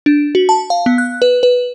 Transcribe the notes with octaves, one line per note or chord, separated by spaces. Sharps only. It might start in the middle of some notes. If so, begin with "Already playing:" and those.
D4
F#4
A5
F5
B3
F#6
B4
B4